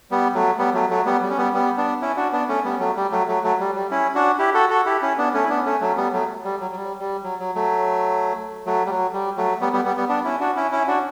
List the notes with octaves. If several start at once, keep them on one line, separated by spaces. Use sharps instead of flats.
G3 B3
F#3 A3
G3 B3
F#3 A3
F#3 A3
G3 B3
G3
C#4
G3 B3
G3 B3
B3 D4
C#4 E4
D4 F#4
B3 D4
A3 C#4
G3 B3
F#3 A3
G3
F#3 A3
F#3 A3
F#3 A3
G3
G3
C#4 E4
D4 F#4
E4 G4
F#4 A4
F#4 A4
E4 G4
C#4 E4
B3 D4
A3 C#4
E4
B3 D4
A3 C#4
F#3 A3
G3 B3
F#3 A3
G3
F#3
F#3
G3
G3
F#3
F#3
F#3 A3
F#3 A3
G3
F#3
G3
F#3 A3
G3 B3
G3 B3
G3 B3
G3 B3
B3 D4
C#4 E4
D4 F#4
C#4 E4
C#4 E4
D4 F#4